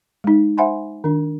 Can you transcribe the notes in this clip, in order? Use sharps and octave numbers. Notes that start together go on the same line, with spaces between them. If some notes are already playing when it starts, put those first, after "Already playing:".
G#3 D#4
C5 E5 F#5 G#5 B5 C6
D#3 D4